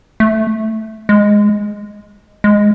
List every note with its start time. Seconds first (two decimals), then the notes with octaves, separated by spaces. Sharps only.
0.20 A3
1.09 G#3
2.44 G#3